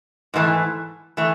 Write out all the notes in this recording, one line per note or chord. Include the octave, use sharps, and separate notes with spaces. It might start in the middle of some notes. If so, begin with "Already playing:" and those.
G#2 E3 A3
E3 A3